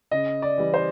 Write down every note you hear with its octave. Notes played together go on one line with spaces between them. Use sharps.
C#3 D#5
D5
E3 G3
C5